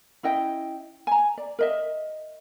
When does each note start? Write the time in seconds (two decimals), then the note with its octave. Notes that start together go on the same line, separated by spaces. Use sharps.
0.23 C#4 E4 D#5 G5
1.07 G#5 A#5
1.38 D5
1.59 A#4 D#5 E5